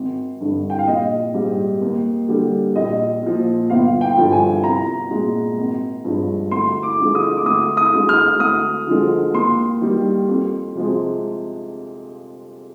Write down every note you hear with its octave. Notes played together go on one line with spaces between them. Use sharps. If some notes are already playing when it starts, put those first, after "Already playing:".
Already playing: G#1
G2 D3
G5
F5
A#1 D#5
G#2 G3
D#2
D3 G3
A#1 D#5
A#2 F3
G1 F5
G5
G2 D3 F3
G#5
C2 A#5
A#2 G#3
G#1
G2 F3 G#3
D2 C6
D6
D3 F3 G#3
D#6
D6
D2 D#6
D#6
D3 G#3
F6
D2 D#6
D3 F3 G#3
D#2 C6
D#3 G3
F2
C3 F3 G#3